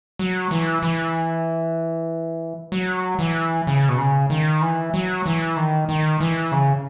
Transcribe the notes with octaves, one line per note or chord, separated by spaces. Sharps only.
F#3
E3
E3
F#3
E3
C#3
B2
C#3
D#3
E3
F#3
E3
D#3
D#3
E3
C#3